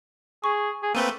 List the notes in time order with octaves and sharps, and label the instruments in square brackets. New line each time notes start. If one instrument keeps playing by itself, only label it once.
[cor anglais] G#4 [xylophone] C#6
[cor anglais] G#4
[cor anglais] A3 [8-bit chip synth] A#3 C4 B4 [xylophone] D#7 G7